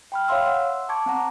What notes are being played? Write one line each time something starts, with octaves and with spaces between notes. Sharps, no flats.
G5 B5 F6
C#5 E5 F5 C6 E6
F#5 C6 E6
A5 C#6 D6 G#6
C4 F#5 A#5